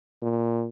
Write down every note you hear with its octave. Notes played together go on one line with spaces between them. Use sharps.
A#2